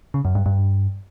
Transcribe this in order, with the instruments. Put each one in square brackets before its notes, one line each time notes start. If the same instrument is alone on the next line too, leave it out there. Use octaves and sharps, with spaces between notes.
[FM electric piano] C#3
F#2
G2
G2